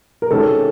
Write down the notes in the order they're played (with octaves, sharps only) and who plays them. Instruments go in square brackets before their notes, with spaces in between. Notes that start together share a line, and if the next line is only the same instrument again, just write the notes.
[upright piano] A#4
[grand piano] C3 D#3 G#3 C#4 F#4 [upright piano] A4